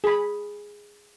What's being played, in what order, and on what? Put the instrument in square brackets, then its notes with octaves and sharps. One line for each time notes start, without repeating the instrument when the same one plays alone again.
[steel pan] G#4 B5